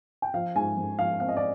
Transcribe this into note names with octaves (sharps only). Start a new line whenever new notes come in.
G5
F3 F5
G#2 G#5
G#2
F3 F5
C4 F5
D#5
D5